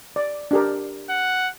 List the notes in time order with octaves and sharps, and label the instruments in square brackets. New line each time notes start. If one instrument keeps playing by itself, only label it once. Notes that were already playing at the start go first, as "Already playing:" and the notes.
[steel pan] D5
D4 G4 A#4
[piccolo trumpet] F#5